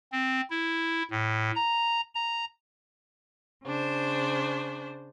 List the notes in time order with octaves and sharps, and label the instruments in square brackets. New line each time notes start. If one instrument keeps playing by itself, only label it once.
[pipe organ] C4
E4
A2
A#5
A#5
[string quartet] C#3 D4 C5